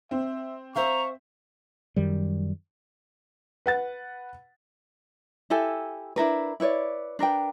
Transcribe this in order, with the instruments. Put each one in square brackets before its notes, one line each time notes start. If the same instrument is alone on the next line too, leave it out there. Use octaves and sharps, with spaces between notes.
[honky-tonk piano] C4 [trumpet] E5
[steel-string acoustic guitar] C5 E5 F5 [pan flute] A#5 [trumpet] C#6
[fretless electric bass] F#2 D#3 G3
[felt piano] B4 F#5 A6
[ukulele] E4 G4 A4 G#5
D4 E4 A#4 B4
E4 B4 C#5 D5
D4 A#4 B4 G5